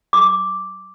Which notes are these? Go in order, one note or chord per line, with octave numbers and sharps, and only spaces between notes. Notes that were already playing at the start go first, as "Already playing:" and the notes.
D6